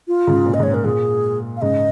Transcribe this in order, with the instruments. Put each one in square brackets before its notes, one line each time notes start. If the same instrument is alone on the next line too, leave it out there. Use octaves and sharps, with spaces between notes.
[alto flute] F4
[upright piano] G#2 C#3
A#2
[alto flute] D#5
[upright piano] G#2
[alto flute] C#5
[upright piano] A#2 [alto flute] A#4
[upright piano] A#2 [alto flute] G#4
[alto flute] F5
[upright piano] G#2 C#3 [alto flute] D#5